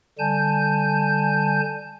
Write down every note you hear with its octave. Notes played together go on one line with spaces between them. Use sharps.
D3 G3 G#5 A5 G6